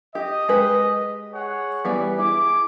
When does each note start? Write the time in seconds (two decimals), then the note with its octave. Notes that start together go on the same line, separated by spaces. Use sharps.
0.15 G4 D#5
0.48 G#3 G4 B4
1.34 G#4 C#5 F#5
1.85 E3 G3 B3
2.18 E4 G#4 D6